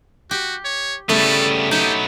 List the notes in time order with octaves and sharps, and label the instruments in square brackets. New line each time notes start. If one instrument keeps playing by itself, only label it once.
[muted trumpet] F#4 [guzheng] G4
[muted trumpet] C#5
[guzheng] C#3 A3 E4 [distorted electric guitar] G3 B3 [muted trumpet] A4
[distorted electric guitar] F#3 B3 [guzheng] D#4 [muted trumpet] G4